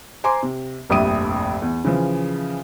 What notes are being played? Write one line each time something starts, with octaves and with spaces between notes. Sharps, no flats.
C5 G#5 A#5 C6 D6
C3
F1 A#1 G2 E5 D#6 D#7
E2
C#3 E3 F3